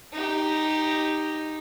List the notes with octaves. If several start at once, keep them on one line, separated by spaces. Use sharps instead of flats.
D#4 G4